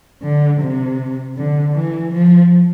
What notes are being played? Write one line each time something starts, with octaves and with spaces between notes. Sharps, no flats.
D3
C3
D3
E3
F3